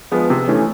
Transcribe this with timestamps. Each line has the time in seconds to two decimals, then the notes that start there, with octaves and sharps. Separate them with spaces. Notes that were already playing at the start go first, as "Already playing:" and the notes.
0.12 F3 G#3 B3
0.30 C3
0.48 E3 A3 C#4